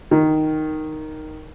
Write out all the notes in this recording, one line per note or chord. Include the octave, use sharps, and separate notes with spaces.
D#3